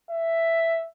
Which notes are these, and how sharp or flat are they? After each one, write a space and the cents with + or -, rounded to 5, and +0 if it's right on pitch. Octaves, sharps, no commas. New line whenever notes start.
E5 +5